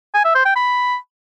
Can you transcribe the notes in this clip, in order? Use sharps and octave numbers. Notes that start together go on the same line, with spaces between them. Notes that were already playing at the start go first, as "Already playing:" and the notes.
G#5
E5
C5
G5
B5